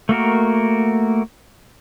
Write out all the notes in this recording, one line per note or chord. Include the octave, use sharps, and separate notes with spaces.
A3 A#3 F#4 A#4